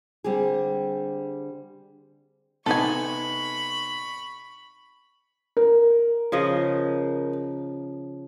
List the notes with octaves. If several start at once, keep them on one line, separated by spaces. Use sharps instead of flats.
D3 G3 C4 G4 G#4
C3 B3 D#4 A4 G#5 B5 C#6
A#4
C#3 F3 D#5